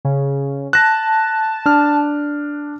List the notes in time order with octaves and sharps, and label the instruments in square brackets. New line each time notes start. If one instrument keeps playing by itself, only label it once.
[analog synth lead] C#3
[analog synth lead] A5 [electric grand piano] F#6 A#6
[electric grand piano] D4 F6